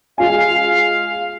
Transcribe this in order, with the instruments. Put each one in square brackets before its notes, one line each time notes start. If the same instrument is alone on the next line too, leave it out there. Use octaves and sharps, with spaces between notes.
[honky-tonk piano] G#3 F4 G#5 [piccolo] F5